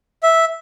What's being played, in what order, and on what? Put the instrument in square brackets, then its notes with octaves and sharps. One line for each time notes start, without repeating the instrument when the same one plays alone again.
[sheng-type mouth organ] E5